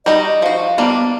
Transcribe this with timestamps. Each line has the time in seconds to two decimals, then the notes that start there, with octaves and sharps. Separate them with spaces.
0.06 G3 D#4 F#4 D#5
0.42 F3 F#4 F5
0.78 G3 A#3 B3 D4